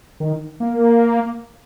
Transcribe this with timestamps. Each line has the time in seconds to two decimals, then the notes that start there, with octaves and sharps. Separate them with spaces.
0.20 D#3
0.60 A#3